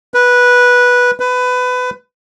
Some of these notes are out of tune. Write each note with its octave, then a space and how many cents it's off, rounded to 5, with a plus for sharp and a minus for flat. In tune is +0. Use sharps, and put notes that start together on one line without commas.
B4 -10
B4 +20